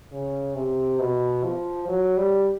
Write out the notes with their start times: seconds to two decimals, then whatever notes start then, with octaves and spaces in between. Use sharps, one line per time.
0.12 C#3
0.55 C3
0.99 B2
1.44 F3
1.88 F#3
2.17 G3